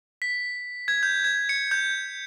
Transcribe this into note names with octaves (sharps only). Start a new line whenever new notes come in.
B6
G#6
G6
G#6
C#7
G6